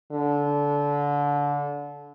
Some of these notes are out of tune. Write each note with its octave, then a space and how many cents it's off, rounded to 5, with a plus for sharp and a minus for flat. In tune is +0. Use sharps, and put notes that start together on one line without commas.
D3 -25